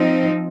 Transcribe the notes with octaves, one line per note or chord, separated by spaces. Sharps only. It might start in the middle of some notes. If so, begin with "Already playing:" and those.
Already playing: F3 C4 D#4